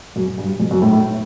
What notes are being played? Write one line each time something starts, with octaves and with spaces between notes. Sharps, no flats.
F#2
G2
F2
F#2
A2
A2